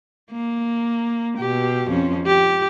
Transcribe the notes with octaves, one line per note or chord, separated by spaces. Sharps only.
A#3
B2 G4
F2 F3 C#4
G4